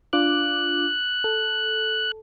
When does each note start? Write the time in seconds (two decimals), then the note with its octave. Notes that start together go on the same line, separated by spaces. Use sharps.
0.13 D4 F4 D6 F#6
1.24 A4